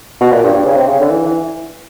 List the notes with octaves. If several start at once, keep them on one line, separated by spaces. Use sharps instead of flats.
B2
A#2
G2
G2
C#3
C3
C#3
D3
E3
E3